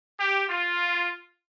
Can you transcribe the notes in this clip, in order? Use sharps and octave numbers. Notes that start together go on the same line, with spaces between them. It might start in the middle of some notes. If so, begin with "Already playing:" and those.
G4
F4